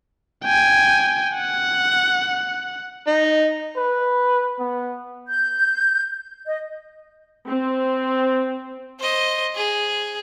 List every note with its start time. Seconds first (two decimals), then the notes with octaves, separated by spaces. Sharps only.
0.45 G5 G#5
1.36 F#5
3.07 D#4
3.76 B4
4.59 B3
5.28 G6
6.46 D#5
7.46 C4
9.00 C5 D#5
9.55 G#4